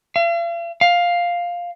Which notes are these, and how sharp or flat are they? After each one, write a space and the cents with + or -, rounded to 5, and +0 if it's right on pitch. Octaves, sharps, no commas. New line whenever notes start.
F5 -45
F5 +5